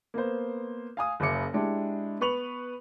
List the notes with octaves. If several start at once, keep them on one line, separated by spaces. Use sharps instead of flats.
A#3 B3 C5
F5 G#5 D#6
F#1 C#3 E5 D6 C#7
G#3 D4 E4 G4
B3 B4 C#6 F7 F#7